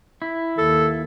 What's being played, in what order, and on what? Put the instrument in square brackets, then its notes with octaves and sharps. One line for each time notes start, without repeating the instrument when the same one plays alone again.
[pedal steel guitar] E4
[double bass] D#2 [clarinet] A4